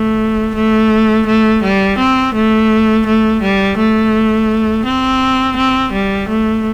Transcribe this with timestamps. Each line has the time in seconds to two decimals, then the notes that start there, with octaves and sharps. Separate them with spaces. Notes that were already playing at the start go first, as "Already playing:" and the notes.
Already playing: A3
0.55 A3
1.26 A3
1.62 G3
1.98 C4
2.34 A3
3.06 A3
3.42 G3
3.77 A3
4.85 C4
5.57 C4
5.93 G3
6.28 A3